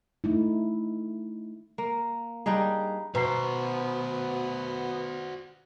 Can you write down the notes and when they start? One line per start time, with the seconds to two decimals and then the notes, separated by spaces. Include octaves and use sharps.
0.24 A3 D#4 E4
1.78 A#3
2.46 G3 D4 D#4 G#4
3.15 B2 B3 F#4 B4 C5 A#5 C7